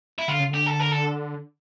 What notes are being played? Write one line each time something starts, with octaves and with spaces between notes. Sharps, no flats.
E4
D3 F4
C#3
D3 G4
A4
A#4
A4